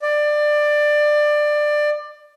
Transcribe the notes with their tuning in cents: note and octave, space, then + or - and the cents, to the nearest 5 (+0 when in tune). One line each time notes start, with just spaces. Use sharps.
D5 +20